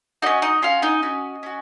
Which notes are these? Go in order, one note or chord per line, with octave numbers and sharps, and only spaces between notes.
C#4 D#4 F#4 D#5
D#4 D#5
C#4 F4 F#4 F5
D#4 D#5
C#4 F#4
C#4 F#4